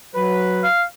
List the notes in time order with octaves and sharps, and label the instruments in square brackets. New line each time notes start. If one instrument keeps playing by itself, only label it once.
[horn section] F#3 B4
[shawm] F5